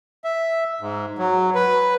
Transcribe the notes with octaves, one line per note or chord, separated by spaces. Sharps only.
E5
G#2
F#3
B4